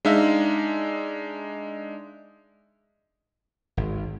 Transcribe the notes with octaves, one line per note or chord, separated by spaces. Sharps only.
G#3 D4 D#4 E5 F5
G#1